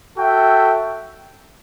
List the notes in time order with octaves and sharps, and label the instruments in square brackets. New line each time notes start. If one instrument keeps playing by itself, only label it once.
[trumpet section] F#4 A4 E5 G5